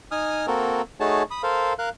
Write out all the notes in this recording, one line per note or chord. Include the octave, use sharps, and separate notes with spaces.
D#4 G#5 D#6 F6
A#3 C4 F#4 A4 A#4
A3 D#4 F#4 G#4 C#5 A5
B5 D#6
A4 A#4 C5 F5
A#4 F5 F#6